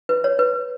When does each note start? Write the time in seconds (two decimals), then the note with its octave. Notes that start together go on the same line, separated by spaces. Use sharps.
0.09 B4
0.24 C#5
0.39 B4